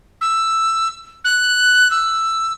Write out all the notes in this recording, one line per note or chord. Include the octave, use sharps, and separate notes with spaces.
E6
F#6
E6